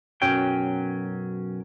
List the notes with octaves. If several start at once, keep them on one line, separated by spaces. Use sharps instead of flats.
B1 F#2 F#3 C#4 G5